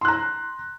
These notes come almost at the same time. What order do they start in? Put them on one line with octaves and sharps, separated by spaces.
C6 F#6 A#5